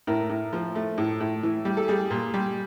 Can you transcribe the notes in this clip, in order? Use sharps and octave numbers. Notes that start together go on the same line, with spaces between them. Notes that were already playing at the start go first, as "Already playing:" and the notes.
A2 A#4
A2
F3
A3
A2
A2
E3
G3
A4
G3 G#4
A#2
G3